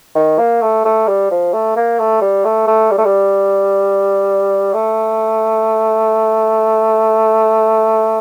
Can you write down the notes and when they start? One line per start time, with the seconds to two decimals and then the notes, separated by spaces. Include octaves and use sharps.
0.15 D#3
0.39 A#3
0.62 A3
0.85 A3
1.08 G3
1.31 F3
1.54 A3
1.76 A#3
1.99 A3
2.22 G3
2.45 A3
2.68 A3
2.91 G3
2.98 A3
3.05 G3
4.74 A3